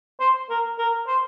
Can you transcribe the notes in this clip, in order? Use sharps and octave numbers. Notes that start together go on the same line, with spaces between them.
C5
A#4
A#4
C5